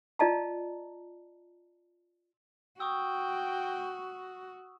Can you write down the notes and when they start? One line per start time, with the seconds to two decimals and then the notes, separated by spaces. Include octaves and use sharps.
0.19 F4 D5 D#5 A5 A#5
2.80 F#4 G5 C#6 D#6 E6